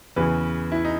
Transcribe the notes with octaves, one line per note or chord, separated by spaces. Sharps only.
E2 C#3 E3 B4
E4
D#4